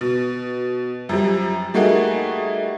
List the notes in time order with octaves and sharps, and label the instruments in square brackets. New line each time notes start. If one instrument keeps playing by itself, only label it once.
[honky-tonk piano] B2
F#2 F3 G3
G3 A3 A#3 D#4 F#4 G#4